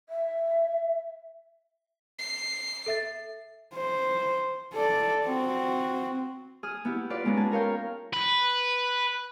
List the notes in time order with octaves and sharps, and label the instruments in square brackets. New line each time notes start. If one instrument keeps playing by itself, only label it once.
[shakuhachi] E5
[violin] C7
[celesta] A4 E5 A6
[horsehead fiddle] C5
A4 D5
C4 F#4
[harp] G#4 D#6 F6
B3 E4 G4
F4 B4 D5 F5
G#3 B3 C#4 D#4 F4
G#4 A5
A#4 C#5 F5 G5
[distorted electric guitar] B4